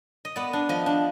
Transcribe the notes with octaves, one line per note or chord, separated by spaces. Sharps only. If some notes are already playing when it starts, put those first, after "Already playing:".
D#5
B3 D5
D4
F3 D#5
D4